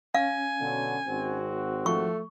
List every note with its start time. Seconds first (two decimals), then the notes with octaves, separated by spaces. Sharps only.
0.15 C#4 F5 G#5
0.61 B2 D3 F#3
1.07 G#1 C4 F#4
1.86 F3 A3 C#6